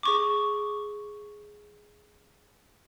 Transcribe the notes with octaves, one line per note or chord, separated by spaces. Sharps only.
G#4 C#6 D6